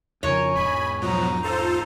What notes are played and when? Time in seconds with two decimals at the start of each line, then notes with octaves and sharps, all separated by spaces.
0.23 F2 C#3 F3 A#4 C#5 G#5
0.55 E1 G#2 D#5 G#5 B5
1.01 B2 F3 F#3 D#4 A#5
1.43 F4 A4 C5